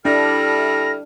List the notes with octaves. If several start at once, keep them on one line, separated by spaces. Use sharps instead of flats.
G3 D4 E4 A4 F6 A#6